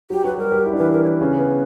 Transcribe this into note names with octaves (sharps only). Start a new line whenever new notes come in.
F#3 F#4 G4
F#3 F#4 B4
G3 G4 A#4
G3 G4
E4
D4
E3 E4 B4
A#4
C#5
B4
C#3 C#4
B3